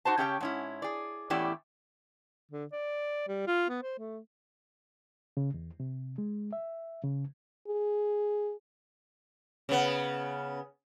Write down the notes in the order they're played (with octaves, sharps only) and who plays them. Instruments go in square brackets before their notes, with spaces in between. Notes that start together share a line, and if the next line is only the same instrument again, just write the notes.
[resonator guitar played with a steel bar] D#4 F#4 C5 A5
C#3 C#4 G4 C#5 D5 G5
G#2 C#4 E4
G#4 D5
E2 A2 C#4 E4 G4 D5
[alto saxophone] D3
D5
G3
F4
B3
C5
A3
[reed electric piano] C#3
E2
C3
G#3
E5
C#3
[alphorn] G#4
[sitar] C#3 B3